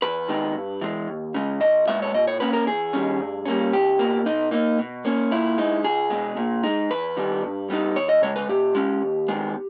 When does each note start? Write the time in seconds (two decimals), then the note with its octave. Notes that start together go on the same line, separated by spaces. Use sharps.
0.02 E2 B4
0.28 D#3 G#3 B3 D#4
0.56 G2
0.81 E3 G#3
1.08 D#2
1.34 C#3 G#3
1.60 B1 D#5
1.87 A#2 G#3 B3 E5
2.02 C#5
2.14 A#2 D#5
2.27 C#5
2.40 A#3 C#4 B4
2.53 A#4
2.67 E2 G#4
2.93 D#3 G3 C#4
3.20 G2
3.45 G3 A#3 C#4
3.73 C#2 G4
3.99 B2 A#3
4.26 B2 D#4
4.51 A#3 D#4
4.79 B2
5.05 A#3 C#4
5.31 A#2 E4
5.58 G#3 D#4
5.84 C#2 G#4
6.10 B2 G#3
6.37 A#2
6.63 G#3 D#4
6.90 E2 B4
7.17 D#3 G3 B3
7.43 G2
7.70 G3 B3 D#4
7.96 D#2 C#5
8.09 D#5
8.22 C#3 G#3 C#5
8.36 B4
8.49 A#2 G4
8.75 G#3 C#4
9.01 D#2
9.28 D#3 G#3 B3